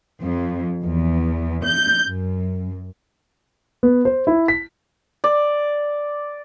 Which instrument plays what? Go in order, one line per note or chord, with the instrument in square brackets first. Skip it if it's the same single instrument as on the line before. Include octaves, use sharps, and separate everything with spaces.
[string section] F2
E2
G6
F#2
[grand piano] B3
C5
E4
B6
[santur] D5